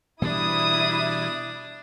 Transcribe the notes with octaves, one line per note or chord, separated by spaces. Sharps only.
B2 E3 G3 D4 E4 D#6